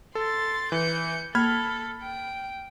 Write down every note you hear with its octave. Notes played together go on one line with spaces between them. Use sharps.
A4 C6 A6
E3 G6 C#7
A#3 A4 B5 F6 G#6
G5